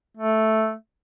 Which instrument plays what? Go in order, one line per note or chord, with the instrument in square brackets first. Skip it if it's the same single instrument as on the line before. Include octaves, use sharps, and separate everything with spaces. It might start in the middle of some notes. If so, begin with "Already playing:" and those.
[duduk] A3